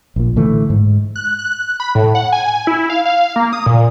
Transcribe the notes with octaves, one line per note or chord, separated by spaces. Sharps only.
A#1 A#2
A2 D3 E3 A3
G#2
F#6
F#6
B5
A2
F#5
G#5
E4
F5
F5
A#3
D#6
A#2